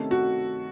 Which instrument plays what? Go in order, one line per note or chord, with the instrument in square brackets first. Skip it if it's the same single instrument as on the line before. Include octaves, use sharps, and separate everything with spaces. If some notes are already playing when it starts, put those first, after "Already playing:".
Already playing: [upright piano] C3 D#3 A3 C#4 A4
[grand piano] F#4